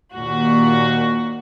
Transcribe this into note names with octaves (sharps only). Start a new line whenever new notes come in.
D#2 A#2 F#4